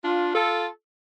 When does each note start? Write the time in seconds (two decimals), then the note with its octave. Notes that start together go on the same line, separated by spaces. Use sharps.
0.03 D4 F4
0.34 F4 A4